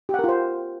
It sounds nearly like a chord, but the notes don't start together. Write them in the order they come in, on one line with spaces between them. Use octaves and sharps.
G4 F#5 A#4 F4 C5